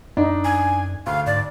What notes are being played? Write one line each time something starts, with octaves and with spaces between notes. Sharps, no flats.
F#2 D4 D#4
G#5
D2 F5
G#2 D5